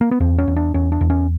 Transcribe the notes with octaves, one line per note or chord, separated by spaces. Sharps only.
A#3
B3
E2 C4
C#4
E2
D4
E2 C#4
D4
E2
C#4